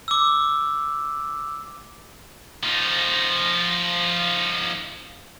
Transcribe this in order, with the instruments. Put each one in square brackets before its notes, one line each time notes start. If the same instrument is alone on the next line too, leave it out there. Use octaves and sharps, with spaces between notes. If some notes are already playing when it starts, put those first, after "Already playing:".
[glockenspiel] D6 E6
[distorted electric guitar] F3 D#4